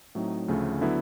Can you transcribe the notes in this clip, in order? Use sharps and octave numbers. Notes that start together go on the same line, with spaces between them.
A2 F#3 A3 C4 D#4
D2 C#3 F3 A3
D3 F#3 B3 E4